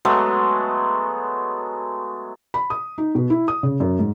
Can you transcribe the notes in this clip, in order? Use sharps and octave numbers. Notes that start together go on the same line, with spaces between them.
F#3 G#3 A3 B3
B5
D#6
D#4
B2
E4
D#6
C#3
F#2
G#2